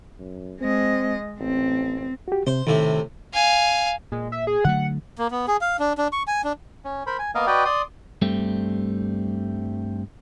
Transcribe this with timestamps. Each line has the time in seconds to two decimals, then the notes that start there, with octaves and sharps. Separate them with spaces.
0.19 F#2
0.61 G#3 C4 D#5
1.40 A1 C4
2.28 F#4 G4
2.47 C3 C5
2.67 A2 C3 D#3
3.34 F5 G#5
4.12 A#2 G#3
4.32 E5
4.47 G#4
4.65 D3 F#3 A3 F#5
5.18 A#3
5.31 B3
5.48 G#4
5.61 F5
5.79 D4
5.98 D4
6.13 C#6
6.27 G#5
6.44 D4
6.85 C#4
7.07 A#4 C5 B5
7.19 G#5
7.35 A#3 B3 A#4 D#5 F5
7.47 F#4 B4 D5 D#5 G5
7.65 D5 C6 D#6
8.22 G2 G3 A3 C4